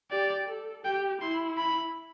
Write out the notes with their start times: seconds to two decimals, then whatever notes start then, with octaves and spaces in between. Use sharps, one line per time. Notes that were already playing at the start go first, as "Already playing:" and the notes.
0.11 G4 D5
0.48 A4
0.85 G4 G5
1.21 E4 C6
1.58 B5